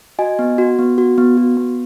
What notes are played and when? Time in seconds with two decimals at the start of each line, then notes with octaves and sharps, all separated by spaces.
0.19 F#4 D#5 G#5
0.39 B3
0.58 F#4
0.79 B3
0.98 F#4
1.18 B3
1.38 F#4
1.57 B3